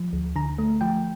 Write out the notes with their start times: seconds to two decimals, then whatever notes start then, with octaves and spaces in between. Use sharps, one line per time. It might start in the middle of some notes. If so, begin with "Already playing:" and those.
Already playing: F3
0.13 D2
0.36 D3 A#5
0.59 A3
0.81 F3 G5